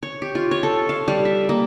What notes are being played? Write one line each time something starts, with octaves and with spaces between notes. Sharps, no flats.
C#5
G4
F4
C#5
A4
F5
G3
E5
A#3